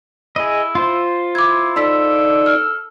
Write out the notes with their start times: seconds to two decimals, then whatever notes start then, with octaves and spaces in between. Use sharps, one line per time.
0.36 E4 G#4 D#5
0.75 F4 C5
1.35 E4 D6 G#6
1.76 D#4 A4 D5 B5 E6 B6
2.46 F6